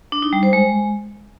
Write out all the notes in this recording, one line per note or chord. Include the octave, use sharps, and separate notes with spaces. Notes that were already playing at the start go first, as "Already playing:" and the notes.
D4
D#4
G3
C5
G#3